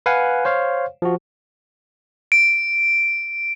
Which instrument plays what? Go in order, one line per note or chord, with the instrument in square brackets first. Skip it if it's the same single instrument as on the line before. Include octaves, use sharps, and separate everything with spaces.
[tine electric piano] B4 F5 F#5 G#5
C5 C#5 F5
F3 F#4
[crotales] D7